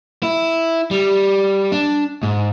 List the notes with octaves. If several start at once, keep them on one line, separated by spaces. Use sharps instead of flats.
E4
G3
D4
G#2